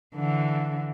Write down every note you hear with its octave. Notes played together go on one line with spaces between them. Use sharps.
D3 E3